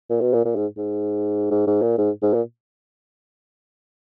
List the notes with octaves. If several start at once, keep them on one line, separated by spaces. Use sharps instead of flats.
A#2
B2
A#2
A#2
G#2
G#2
G#2
G#2
A#2
G#2
G#2
A#2